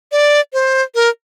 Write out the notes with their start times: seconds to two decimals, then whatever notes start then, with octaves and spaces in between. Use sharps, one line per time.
0.12 D5
0.53 C5
0.95 A#4